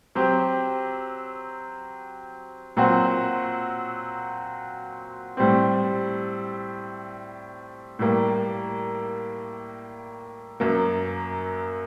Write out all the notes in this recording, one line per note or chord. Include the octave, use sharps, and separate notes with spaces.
F#3 C4 G4
A#2 F#3 C4 F#4
A2 G3 C4
A2 G3 A#3
F#2 F#3 A#3